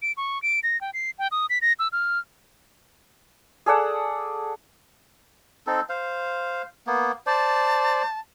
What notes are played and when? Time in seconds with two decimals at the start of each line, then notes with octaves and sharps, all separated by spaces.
0.02 D7
0.17 C#6
0.42 D7
0.63 A#6
0.81 G5
0.94 C7
1.19 G5
1.32 D#6
1.50 B6
1.62 A#6
1.79 E6
1.92 F6
3.66 G#4 A4 D5 F#5
5.67 C4 D#4 A4
5.89 C5 F5
6.87 A#3 B3
7.26 C5 D5 A5